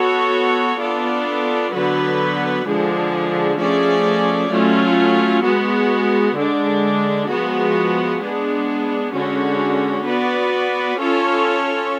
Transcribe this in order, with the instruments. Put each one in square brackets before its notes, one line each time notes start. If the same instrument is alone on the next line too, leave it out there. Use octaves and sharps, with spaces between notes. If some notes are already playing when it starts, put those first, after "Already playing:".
Already playing: [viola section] B3 F#4 A4 C#5
B3 D4 F4 A4 D5
D3 F#3 B3 F#4 B4
D3 F3 G#3 D4 G#4
F3 A3 C#4 G#4 D5
F#3 A3 C#4 F4
G#3 B3 F#4
D3 G#3 D4
F3 G#3 B3 F#4
G#3 B3 D4 G#4
D3 G#3 C#4 F#4
B3 F#4 B4 D5
C#4 F4 A4 C#5